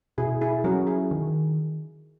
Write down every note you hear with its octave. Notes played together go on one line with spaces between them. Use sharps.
B2 E4 G#4
E4 G#4
F#3 C#4 F#4 A#4
E4 G#4
D#3